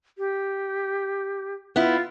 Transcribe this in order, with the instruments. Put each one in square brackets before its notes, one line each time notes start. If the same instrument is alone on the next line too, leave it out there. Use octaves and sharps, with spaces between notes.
[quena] G4
[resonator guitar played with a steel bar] B3 E4 [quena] F4